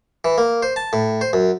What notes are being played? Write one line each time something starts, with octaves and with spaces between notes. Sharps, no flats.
E3
A#3
C5
A5
A2
C5
F#2